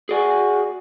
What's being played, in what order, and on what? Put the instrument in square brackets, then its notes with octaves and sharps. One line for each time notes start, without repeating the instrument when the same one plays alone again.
[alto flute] F#4 [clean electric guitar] G#4 D5 G#5